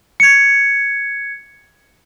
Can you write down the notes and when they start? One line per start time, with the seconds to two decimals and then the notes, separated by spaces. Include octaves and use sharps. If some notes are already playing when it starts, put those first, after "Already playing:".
0.20 G#6 C#7